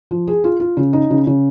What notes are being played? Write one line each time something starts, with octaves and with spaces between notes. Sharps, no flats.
F3
G#4
F4
F4
C#3
D#4
C#3
C#3